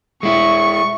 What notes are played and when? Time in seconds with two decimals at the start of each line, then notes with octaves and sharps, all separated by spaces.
0.23 G#3 E4 C#6